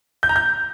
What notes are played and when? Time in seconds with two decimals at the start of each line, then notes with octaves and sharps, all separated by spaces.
0.23 G6
0.29 A#5
0.36 G6